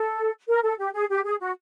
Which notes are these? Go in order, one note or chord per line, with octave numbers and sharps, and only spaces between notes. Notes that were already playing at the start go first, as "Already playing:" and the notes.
Already playing: A4
A#4
A4
G4
G#4
G4
G#4
F#4